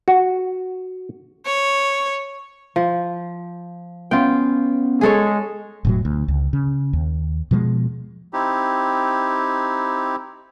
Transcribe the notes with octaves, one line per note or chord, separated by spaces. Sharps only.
F#4
C#5
F3
B3 C#4 F4 G5
G#3 G#4 A4 C#5
E1 A2 F#3
D2
C#2
C#3
D#2
B2 F3 F#3 G#3
C4 D#4 E4 G4